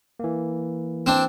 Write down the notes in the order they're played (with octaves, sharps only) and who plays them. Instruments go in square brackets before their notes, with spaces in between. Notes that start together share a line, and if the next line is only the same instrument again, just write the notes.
[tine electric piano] E3 A#3
[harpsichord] C4 D4